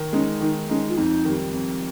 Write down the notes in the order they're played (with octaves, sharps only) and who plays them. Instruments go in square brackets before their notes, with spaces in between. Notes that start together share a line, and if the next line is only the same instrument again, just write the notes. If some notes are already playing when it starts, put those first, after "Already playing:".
Already playing: [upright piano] D#3
[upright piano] G#3 D#4 [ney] C#4
[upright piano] D#3 [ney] D#4
[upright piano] G#3 D#4 [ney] C#4
[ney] F4
[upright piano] F2 [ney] D#4
[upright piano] D#3 G3
F2